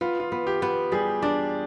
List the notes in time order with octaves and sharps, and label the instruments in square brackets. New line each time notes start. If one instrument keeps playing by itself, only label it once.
[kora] B3 [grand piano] F4
[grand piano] F4
[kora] B3
[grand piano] G4
[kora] B3
[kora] G3 [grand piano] G#4
[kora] D4 [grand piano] D5